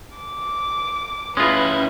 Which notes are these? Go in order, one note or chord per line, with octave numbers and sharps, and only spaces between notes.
D6
G#3 C#4 E4 F4 B4